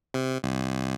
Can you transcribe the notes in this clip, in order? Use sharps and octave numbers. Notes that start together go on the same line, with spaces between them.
C3
C2